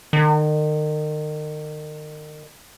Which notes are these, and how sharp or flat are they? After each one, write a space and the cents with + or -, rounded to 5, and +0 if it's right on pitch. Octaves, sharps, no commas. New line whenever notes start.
D#3 -35